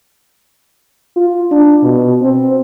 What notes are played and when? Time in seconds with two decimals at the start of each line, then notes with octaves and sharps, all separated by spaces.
1.17 F4
1.51 D4
1.83 B2
2.22 C4